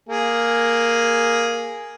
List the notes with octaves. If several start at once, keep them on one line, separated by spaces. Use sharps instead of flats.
A#3 G#4